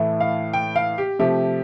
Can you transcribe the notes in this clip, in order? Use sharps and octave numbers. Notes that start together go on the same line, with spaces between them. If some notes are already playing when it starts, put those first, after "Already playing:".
Already playing: A2 E3 A3
F5
G5
F5
G4
C3 F3 A3 G4